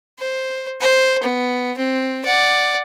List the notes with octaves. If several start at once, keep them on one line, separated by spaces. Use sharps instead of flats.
C5
C5
B3
C4
D5 F#5